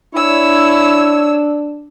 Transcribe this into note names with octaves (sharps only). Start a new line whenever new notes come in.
D4 E4 C#5 E6